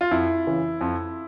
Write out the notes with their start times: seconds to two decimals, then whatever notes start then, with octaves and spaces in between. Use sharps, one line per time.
0.01 F4
0.11 F2 E4
0.47 C#3 E3
0.81 F2